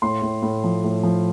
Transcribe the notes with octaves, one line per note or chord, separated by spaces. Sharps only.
A2 C6
A2
A2
F3
A2
F3